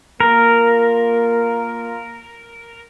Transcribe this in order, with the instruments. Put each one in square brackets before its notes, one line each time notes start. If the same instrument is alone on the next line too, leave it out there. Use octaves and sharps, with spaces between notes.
[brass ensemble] A#3 F4 [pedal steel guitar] A#4